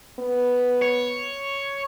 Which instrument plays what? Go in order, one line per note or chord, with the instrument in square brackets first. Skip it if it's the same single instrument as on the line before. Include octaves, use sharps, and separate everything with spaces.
[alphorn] B3
[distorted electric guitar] C#5